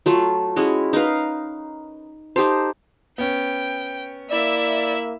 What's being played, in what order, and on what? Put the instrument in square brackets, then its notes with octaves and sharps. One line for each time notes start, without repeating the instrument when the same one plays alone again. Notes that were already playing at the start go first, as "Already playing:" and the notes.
[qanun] F#3 A3 F4
G#3 C#4 E4 F#4
D#4 A#4 B4 F5
D#4 G4 A4 C5
[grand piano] B3 C#4 [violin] G5
[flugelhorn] A#3 [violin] E4 E5 [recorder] D5